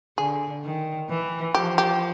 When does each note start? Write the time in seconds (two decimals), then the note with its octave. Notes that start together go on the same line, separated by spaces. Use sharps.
0.18 D3 G#4
0.64 D#3
1.09 E3
1.54 F3 G4
1.78 G4